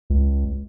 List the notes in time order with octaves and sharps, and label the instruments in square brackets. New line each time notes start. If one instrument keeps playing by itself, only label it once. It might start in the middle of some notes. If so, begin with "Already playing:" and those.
[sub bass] C#2